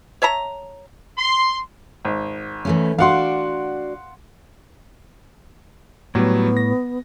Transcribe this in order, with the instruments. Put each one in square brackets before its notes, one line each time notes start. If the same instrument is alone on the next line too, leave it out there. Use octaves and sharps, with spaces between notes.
[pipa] C#5 E5 A5 A#5
[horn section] C6
[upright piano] G#1
[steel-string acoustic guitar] E3 A3 C#4
[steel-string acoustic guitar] D4 F#4 D5 [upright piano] F5 F#5 C6
[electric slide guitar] A2 [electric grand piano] F#3 G3 [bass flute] B3
[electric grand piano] A#6